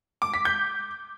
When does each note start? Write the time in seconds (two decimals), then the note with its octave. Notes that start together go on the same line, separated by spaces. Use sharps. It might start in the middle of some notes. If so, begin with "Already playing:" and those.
0.22 D6
0.34 B6
0.45 G6